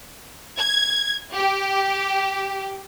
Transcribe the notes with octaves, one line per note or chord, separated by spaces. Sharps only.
G#6
G4